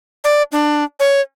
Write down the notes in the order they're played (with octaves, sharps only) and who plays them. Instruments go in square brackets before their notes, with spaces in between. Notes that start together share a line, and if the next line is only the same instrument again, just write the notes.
[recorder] D5
D4
C#5